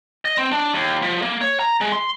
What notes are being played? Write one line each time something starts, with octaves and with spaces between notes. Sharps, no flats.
D#5
C4
D4
D#2
F3
A#3
C#5
A#5
G#3
C6